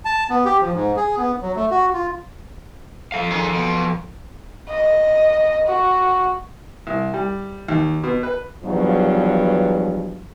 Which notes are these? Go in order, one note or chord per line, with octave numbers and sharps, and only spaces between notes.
A5
B3
G4
F3
G#2
G#4
B3
F#3
A3
F#4
F4
F3 A4 F5
D#3 G#4
B2
D#5
F#4
C2
G3
D#2
B2
B4
E2 G2 B2 F3 F#3